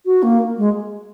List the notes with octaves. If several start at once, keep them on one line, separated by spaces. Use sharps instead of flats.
F#4
A#3
G#3